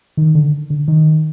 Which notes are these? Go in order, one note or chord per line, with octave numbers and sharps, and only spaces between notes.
D#3
D3
D3
D#3